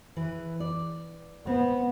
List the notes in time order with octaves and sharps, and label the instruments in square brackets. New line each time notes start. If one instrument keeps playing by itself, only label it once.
[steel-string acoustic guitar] E3 B4
D5
[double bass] B3 [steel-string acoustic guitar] C4